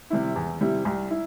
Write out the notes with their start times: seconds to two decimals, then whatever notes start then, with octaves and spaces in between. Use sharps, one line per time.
0.10 C3 G3 E4
0.36 E2
0.61 C3 G3 E4
0.85 C2
1.10 E4